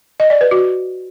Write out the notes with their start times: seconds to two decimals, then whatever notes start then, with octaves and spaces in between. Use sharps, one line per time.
0.20 D#5
0.30 D5
0.41 B4
0.51 F#4